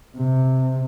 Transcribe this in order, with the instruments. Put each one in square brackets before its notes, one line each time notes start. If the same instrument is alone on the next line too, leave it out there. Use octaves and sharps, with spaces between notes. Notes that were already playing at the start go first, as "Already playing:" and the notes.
[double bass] C3